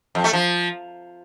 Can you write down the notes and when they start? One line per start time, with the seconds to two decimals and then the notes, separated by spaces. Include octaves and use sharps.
0.15 F2
0.24 A3
0.33 F3